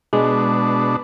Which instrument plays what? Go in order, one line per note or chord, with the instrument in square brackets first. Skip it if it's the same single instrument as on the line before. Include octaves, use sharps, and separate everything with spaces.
[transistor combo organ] B2 D4 [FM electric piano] G#3